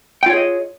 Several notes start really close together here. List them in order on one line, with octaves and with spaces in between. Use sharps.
G5 F4 C#5 G#4 D#5